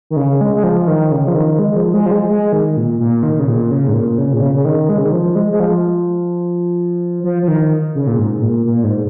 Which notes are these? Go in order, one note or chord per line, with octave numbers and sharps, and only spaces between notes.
D#3
C#3
G#3
G#3
F3
D#3
C#3
F3
D#3
G#3
F3
G#3
F3
G#3
G#3
D#3
A#2
A#2
D#3
C#3
A#2
C#3
G#2
A#2
C#3
A#2
C#3
C#3
D#3
G#3
C#3
D#3
F3
G#3
G#3
F3
F3
F3
D#3
C#3
A#2
G#2
A#2
A#2
G#2